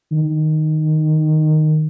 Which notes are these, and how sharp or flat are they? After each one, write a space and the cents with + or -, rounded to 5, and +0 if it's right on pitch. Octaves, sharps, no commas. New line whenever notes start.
D#3 -5